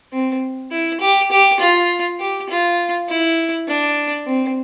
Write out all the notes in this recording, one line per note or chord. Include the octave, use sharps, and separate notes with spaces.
C4
E4
G4
G4
F4
G4
F4
E4
D4
C4